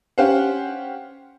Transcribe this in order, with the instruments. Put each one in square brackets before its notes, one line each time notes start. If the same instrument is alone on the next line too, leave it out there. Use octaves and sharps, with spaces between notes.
[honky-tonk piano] C#4 G4 C5 F5 F#5